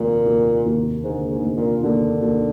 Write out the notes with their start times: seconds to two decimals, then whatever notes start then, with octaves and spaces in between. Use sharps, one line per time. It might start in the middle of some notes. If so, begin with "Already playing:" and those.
Already playing: F1 D#2 A#2
0.26 D#2
0.66 D#2
1.04 G#2 D3
1.30 G#2
1.43 F1
1.57 A#2
1.83 D#2 D3
2.22 D#2